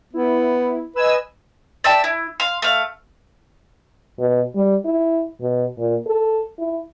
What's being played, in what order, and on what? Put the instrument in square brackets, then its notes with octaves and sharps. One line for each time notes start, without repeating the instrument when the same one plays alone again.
[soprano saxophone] B3 [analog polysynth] E4
[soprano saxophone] B4 [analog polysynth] D#5 G#5 E6
[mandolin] D5 E5 G5 A5
E4
F5 C6
A3 F5
[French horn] B2
G3
E4
B2
A#2
A4
E4